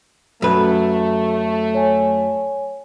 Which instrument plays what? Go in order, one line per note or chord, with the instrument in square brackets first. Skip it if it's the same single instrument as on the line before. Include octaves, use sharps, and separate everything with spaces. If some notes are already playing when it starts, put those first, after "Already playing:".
[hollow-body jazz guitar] F#2 B4 [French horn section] A3
[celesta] C#5 G#5